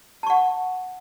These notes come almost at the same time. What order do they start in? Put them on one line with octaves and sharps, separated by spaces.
A5 C#6 F#5